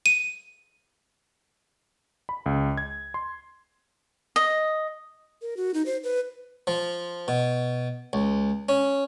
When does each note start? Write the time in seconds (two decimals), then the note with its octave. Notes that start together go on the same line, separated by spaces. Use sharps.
0.06 D#7
2.29 B5
2.46 C#2
2.77 G#6
3.14 C6
4.36 D#5
5.42 A#4
5.57 F#4
5.74 D#4
5.86 C5
6.04 B4
6.67 F3
7.28 B2
8.13 C#2
8.69 C#4